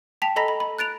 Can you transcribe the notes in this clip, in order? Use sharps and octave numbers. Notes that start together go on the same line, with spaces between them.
G5 A5 B6 F7
A4 D#5 A#5 B5 A#6 B6
B5
B5
F#6 A6 D7 F7